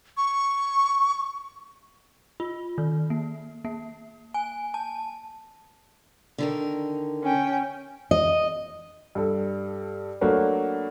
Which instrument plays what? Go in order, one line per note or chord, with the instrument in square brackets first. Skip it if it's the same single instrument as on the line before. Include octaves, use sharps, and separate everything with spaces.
[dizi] C#6
[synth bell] F4
D#3
A#3
A#3
G#5
A5
[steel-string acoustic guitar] D3 D#3 A#4
[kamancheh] C#4 G5
[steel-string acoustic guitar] D#5
[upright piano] G2 A4
F#3 A3 A#3 D4 F#4 B4